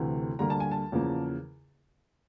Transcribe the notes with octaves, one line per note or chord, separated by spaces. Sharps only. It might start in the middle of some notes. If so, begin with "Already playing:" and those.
Already playing: D2 C3 E3 A3
D2 D3 G3 A#3 A#5
A5
G#5
A5
E2 C#3 F3 A#3